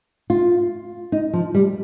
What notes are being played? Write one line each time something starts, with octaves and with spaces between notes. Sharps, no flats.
F4
D#4
F3
G3